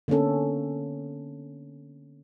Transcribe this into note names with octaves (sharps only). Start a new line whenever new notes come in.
D3 A#3 B3 C#4 A4